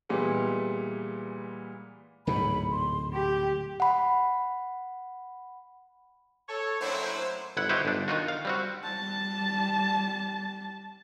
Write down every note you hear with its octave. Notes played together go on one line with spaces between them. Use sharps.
A#2 E3 G3 G#3 B3
D1 G#2 B2 B5
C6
G4 G5
F#5 B5
A4 C#5
F#2 A2 F#3 A#3 D4 E4 C5
G1 E4 F#5
D#4 E4 F#4 G4 B4 C5
G1 D4
D#3 D#4 F4 F#4
F5
G3 C4 F#4
G3 A5